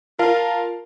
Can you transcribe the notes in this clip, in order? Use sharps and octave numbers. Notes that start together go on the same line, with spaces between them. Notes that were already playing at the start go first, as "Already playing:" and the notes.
F4 A#4 F5 A5